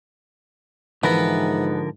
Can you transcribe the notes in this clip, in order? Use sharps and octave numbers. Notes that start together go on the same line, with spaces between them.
G#2 D3 E3 F3 B3 A#4